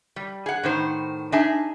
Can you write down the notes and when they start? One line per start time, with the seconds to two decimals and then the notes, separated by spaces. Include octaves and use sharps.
0.16 G3
0.46 G#4 F#5
0.64 A2 D#3 C5
1.32 D4 D#4 G#4 E5 G#5 A5